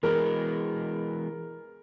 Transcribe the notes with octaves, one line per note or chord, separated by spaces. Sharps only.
E3 G#3 B3 A#4